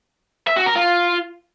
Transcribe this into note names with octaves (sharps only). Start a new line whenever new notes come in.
E5
F#4
A#4
F4